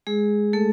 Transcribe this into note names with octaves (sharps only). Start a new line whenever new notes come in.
G#3 G#4
A3 A4